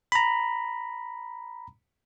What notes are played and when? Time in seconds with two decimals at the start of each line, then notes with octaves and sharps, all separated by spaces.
0.12 A#5 B5